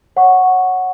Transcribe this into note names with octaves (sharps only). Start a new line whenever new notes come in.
C#5 F#5 C#6